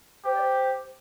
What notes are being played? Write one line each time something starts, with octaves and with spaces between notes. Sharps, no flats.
G4 C5
D5
C5